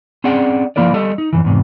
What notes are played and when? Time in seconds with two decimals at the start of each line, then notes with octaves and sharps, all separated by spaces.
0.24 C4 C#4 G#4 D5 F#5
0.76 F3 A#3 E4 A#4 D5
0.93 G3 A4 D#5
1.18 D#4
1.33 F#2 A#2 E3
1.44 E2 G#2 C3